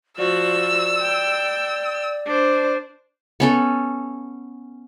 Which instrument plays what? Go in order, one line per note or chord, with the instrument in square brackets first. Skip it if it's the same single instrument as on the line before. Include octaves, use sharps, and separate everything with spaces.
[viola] F3 F#4 [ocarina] D5 [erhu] E6
[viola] G5
D4 C5
[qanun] B3 C#4 A4